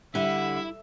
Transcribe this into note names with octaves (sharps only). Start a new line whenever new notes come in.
D3 G3 E4 E5